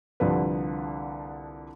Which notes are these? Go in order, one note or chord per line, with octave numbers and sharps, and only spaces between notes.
C2 D3 F3 G3 B4